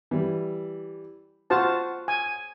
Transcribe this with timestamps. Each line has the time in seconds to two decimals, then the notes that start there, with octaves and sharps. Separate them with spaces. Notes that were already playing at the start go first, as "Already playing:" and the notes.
0.11 E3 G3
1.50 F4 F#4 C5 F#5 A5 F6
2.08 G#5